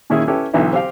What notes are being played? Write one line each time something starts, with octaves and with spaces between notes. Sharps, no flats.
A#2 D#3 C#4 E4 G#4
C#4 E4 G4 A4 B4
B1 D3 E3 B3 D#4 E4
C4 G4 F5 G5